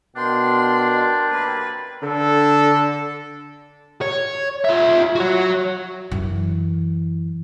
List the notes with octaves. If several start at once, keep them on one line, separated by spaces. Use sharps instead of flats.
B2 D4 A#4 F5 G5 C6
F#2 C3 A#3 B4
D3 A4
C#5
F4 E5
F#4 C#5
F#2 E3